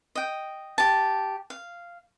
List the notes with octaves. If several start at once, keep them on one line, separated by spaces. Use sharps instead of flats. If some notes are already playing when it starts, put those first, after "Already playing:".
D#5 G5
G4 A5
F5